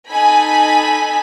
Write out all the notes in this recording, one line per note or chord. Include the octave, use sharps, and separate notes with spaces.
D#4 A4 G#5 B5